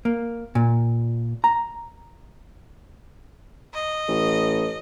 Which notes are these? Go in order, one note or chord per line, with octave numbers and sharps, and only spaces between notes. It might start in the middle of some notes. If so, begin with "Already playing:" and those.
A#3
A#2
A#5
D#5
A1